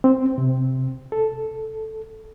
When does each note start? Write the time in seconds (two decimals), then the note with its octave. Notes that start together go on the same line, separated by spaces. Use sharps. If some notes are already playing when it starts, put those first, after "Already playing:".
0.04 C4
0.38 C3
1.12 A4